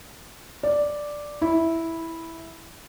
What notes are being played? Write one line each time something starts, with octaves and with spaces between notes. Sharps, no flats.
D5
E4